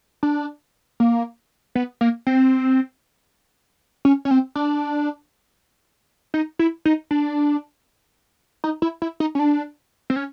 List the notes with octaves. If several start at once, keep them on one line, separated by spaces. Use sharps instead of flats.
D4
A#3
B3
A#3
C4
C#4
C#4
C4
D4
D#4
E4
D#4
D4
D#4
E4
E4
D#4
C#4
D4
C4
C#4